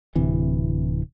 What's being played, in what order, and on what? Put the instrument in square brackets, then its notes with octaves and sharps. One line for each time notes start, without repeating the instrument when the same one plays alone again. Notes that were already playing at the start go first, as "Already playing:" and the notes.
[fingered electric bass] D1 C3 E3